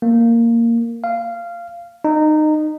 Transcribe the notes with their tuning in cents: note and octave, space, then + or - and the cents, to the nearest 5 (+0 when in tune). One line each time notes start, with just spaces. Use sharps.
A#3 -10
F5 -15
D#4 -20